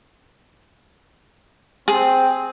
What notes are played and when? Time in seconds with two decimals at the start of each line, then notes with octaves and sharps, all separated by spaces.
1.88 C4 G#4